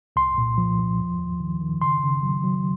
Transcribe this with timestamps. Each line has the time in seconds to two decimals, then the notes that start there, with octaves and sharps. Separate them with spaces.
0.16 C2 C6
0.38 A#2
0.58 F3
0.79 F3
1.00 D#2
1.20 D#2
1.40 D#3
1.61 D#3
1.82 C#3 C6
2.03 C#3
2.23 F#3
2.43 F#3